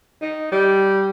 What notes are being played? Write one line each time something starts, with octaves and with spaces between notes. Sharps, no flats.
D#4
G3